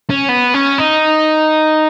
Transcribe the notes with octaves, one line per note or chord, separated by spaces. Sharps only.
C#4
B3
C#4
D#4